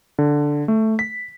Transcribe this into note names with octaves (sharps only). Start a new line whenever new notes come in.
D3
A3
B6